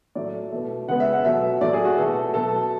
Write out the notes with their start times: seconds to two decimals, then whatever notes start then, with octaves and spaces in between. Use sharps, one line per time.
0.15 A2 F#3 A3 D5
0.52 B2 A3
0.88 C#3 G#3 B3 F#5
1.00 E5
1.13 F#5
1.25 B2 F#3 A3 E5
1.61 A2 F#3 A3 D5
1.73 G#4
1.85 F#4
1.98 B2 A3 A4
2.34 B2 F#3 A3 A4